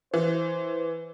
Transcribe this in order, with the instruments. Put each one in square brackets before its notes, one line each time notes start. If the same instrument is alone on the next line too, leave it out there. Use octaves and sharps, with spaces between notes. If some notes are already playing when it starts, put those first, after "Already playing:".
[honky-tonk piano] E3 [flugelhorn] C5